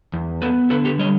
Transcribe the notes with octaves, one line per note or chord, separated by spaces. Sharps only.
E2
B3 A4 B4
D3 A4 B4
G4 A4
G3 C#5 D#5